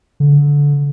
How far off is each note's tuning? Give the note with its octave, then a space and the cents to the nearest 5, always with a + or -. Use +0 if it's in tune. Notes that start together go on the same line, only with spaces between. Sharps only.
D3 -20